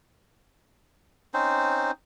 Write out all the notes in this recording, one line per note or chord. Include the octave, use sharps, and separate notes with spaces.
C4 C#4 D#4 C5